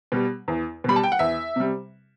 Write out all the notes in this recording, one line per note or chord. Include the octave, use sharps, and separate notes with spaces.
B2 G3
E2
B2 G3 B5
A5
G5
F#5
E2 E5
C3 G3